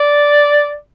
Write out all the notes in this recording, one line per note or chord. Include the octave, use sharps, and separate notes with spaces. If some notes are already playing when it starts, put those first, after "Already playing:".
Already playing: D5